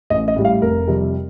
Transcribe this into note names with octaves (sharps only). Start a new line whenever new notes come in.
A1 D#5
D#5
A2 G3
F5
F1 A#4
F2 C3 G3